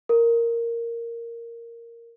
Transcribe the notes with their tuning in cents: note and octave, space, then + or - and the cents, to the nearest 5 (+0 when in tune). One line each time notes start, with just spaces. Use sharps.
A#4 -5